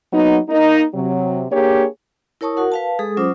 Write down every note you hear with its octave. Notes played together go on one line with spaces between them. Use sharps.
F#3 A#3 B3 D#4
A#3 D#4
C3 F#3
A#3 D4 G4 G#4 C#5
E4 A#4 C#5 A5 C#6 D#6
F#4 A#4 F#5
B4 F5 A5
G#3 G#4 A4 D#6
F#3 C#4 F4 C5 D6 D#6